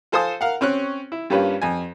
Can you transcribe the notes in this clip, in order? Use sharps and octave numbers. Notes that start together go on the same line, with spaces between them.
F4 A4 C5 G#5 A5 D#6
A#4 F5 F#5
C4 C#4 C#6 F#6
E4
G2 G3 A#3 C#4 F4 B4
F2 G#5